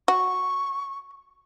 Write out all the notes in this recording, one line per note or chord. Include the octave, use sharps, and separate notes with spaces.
F#4 C#6